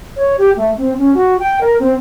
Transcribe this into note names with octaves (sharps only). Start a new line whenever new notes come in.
C#5
G4
A3
C4
C#4
F#4
G5
A#4
C4